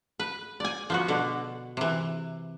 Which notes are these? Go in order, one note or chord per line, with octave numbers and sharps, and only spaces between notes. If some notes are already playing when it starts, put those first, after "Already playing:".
B4
D5 G#5
F3 B3 F#4
B2 D3
C3 E3